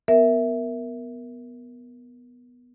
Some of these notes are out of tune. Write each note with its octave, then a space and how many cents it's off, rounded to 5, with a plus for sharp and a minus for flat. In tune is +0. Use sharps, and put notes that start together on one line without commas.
B3 +0 A#4 +0 E5 +0